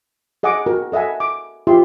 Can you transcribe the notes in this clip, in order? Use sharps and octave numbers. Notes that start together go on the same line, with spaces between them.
G#4 D#5 F#5 G#5 D6
F#4 A#4
A4 D#5 E5 F#5 G#5
D6
F4 G4 E5 C6